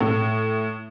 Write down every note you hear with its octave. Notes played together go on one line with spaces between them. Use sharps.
A2